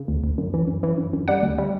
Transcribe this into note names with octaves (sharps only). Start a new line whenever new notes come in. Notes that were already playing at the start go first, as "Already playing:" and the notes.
Already playing: C#3
D2
D2
F#2
E3
F#2
E3
F#2
F#2
G3 F#5
D2
G3